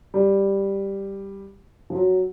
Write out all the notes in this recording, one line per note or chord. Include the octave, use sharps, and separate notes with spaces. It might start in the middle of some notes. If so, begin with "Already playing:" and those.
G3
F3
F#3